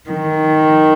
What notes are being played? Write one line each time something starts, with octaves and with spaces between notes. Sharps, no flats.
D#3